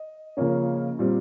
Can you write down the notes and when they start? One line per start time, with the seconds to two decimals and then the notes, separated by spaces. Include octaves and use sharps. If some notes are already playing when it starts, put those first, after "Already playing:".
Already playing: D#5
0.37 C#3 F3 A#3 C#4
0.99 A#2 G3 C4